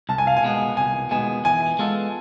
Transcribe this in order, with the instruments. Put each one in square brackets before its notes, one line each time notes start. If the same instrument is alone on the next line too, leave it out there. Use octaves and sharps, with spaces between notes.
[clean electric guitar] C2 [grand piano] A5
[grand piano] G#5
F5
G#5
[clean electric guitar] B2 G#3 B3
[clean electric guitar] C2 [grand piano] G#5
[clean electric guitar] B2 G#3 B3 [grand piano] G#5
[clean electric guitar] E3 [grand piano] G#5
[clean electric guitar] G#3 B3 F4 A4